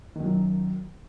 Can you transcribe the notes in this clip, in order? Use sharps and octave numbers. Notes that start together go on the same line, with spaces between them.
F#2 D#3 F#3